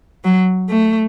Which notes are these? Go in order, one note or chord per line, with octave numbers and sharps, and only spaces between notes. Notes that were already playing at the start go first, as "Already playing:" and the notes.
F#3
A3